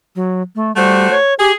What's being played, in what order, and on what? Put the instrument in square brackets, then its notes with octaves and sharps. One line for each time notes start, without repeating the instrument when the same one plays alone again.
[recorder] F#3
A3
[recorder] G3 [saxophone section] A3 F#4 C5
[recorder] C#5
[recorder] G4 [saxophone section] G#4